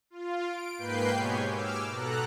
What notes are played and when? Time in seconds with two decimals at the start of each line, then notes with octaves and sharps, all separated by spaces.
0.10 F4
0.45 D7
0.78 G#2 A#3 B4 G5 G6 C7
1.13 G#2 B2 G4 C#5 G#5
1.52 D6 E6 F6
1.90 B2 A4 A#5 F#6